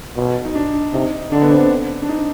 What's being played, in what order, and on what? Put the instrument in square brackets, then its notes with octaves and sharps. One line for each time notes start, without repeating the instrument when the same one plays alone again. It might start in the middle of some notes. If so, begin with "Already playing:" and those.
[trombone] B2
[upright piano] D#4
D4
[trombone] C3 [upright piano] D#4
[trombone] D3 [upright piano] D4
[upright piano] B3
C4
D4
D4
D#4